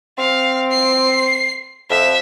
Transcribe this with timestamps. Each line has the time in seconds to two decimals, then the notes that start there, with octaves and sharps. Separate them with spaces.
0.18 C4 F5
0.71 C7
1.90 F2 E5